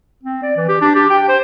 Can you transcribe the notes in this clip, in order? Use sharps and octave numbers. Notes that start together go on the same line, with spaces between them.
C4
D5
E3
G4
D4
G4
G5
C5